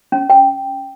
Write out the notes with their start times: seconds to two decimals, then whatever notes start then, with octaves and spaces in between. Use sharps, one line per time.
0.12 C#4
0.30 G5